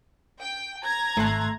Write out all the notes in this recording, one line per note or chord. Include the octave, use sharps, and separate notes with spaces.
G5
A#5 G#6
G#1 A3 A5 C6 F#6